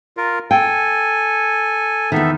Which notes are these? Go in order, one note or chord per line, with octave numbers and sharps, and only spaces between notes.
F4 A#4
A4 G5 G#5
E2 D#3 B3 A4 E5